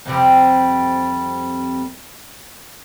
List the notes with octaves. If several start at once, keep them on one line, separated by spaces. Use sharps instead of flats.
F2 C3 G3